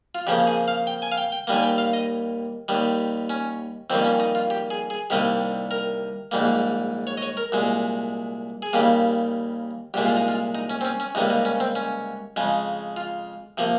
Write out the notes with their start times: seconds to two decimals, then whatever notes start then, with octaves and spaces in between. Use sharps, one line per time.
0.15 F4
0.27 F2 C#3 F3 A#3 G4
0.47 G#4
0.68 F5
0.87 G5
1.02 G#5
1.12 F5
1.18 G5
1.32 G5
1.47 D#2 D#3 G3 A#3 G#5
1.63 G5
1.78 F5
1.93 D#5
2.68 D#2 D#3 G3
3.30 C#4
3.90 F2 D#3 G3 A#3 C4
4.04 C#4
4.20 D#4
4.35 F4
4.50 G4
4.71 G#4
4.90 G#4
5.10 C2 C3 D#3 G3 A#3 G4
5.71 A#4
6.31 A#1 G#2 G3 A#3
7.07 C#5
7.17 D#5
7.22 C#5
7.37 A#4
7.52 C2 A#2 G#3
8.62 G#4
8.73 D#2 C#3 G3 A#3 G4
9.94 C2 A#2 G#3 G4
10.05 F4
10.17 D#4
10.28 F4
10.55 D#4
10.70 C#4
10.81 C4
10.85 C#4
11.00 C#4
11.15 C#2 C3 G3 A#3 D#4
11.30 D#4
11.45 C#4
11.60 C4
11.76 C#4
12.36 F2 C#3 G#3
12.97 F4
13.57 C3 F3 A#3